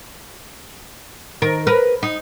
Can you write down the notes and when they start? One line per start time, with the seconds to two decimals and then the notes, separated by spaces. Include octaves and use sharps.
1.42 D#3 A#4
1.67 A#4 B4
2.03 D#4